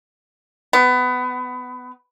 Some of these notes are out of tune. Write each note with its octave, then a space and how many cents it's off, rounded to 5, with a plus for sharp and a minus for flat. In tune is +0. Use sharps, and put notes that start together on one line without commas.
B3 +20